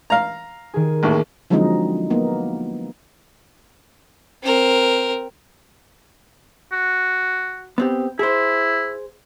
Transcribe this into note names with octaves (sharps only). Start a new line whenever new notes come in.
F5 A#5
D#3 G#4
A1 D#2
D3 F3 F#3 G#3 C4 D#4
A#3 B3 D#4
C4 A#4
F#4
B3 C4 G4
E4 G#4 C5